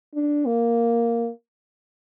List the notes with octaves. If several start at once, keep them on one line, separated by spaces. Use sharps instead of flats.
D4
A#3